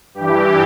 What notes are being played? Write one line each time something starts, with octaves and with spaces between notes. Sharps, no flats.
G2 E3 G4